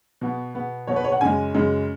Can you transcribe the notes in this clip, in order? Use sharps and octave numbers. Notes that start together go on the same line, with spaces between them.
B2 B3
B2 B3
B2 B3 C#5
B4
C#5
F#5
F#2 C#3 G#3 G#5
F#2 C#3 G#3